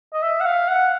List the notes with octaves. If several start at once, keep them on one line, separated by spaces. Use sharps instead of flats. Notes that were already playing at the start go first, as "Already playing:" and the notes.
D#5
E5
F#5
F5
F#5